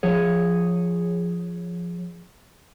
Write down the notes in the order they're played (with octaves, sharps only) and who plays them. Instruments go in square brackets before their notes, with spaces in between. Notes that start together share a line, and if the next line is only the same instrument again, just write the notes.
[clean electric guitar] F3 G#4 C#5